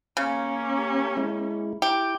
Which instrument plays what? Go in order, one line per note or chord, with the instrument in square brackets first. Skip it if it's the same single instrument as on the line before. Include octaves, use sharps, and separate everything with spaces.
[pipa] C#3 [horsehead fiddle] A#3 C#4
[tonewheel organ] G4
G#3 E4
[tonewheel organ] E4 G5 [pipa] G4